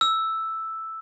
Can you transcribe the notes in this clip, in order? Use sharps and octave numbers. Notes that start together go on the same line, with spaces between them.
E6